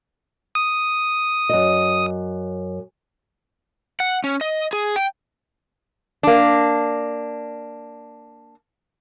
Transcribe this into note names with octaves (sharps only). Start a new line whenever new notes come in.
D#6
F#2 D#5
F#5
C#4
D#5
G#4
G5
A#3 D4